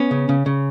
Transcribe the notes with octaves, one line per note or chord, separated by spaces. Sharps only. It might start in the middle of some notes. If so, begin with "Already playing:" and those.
Already playing: B3 C#4
C#3
C#3
C#3